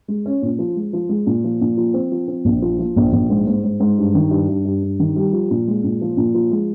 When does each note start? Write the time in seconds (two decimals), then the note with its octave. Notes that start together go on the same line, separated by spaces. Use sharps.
0.08 G#3
0.26 C#4
0.42 A#2
0.59 F3
0.76 G#3
0.93 F3
1.09 G#3
1.26 A#2
1.44 F3
1.61 A#2
1.77 F3
1.94 C4
2.12 F3
2.28 C4
2.45 A#1
2.62 F3
2.79 F3
2.96 A#1
3.13 A#1
3.30 G#2
3.47 G#2
3.64 G#2
3.80 G#2
3.98 G2
4.15 D#3
4.31 G2
4.49 G2
4.65 G2
4.83 G2
5.00 D#3
5.16 G3
5.33 F3
5.51 A#2
5.68 G#3
5.84 A#2
6.01 F3
6.17 A#2
6.34 F3
6.51 G#3